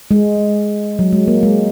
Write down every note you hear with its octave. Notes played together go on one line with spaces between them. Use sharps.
G#3
F#3
G#3
A#3
G#3